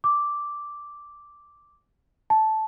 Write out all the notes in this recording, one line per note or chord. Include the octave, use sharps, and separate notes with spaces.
D6
A5